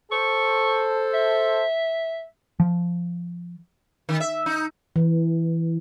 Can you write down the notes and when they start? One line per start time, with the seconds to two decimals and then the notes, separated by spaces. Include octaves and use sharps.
0.12 A4 C5 C#6
1.14 E5
2.60 F3
4.09 D#3
4.20 E5
4.46 D#4
4.96 E3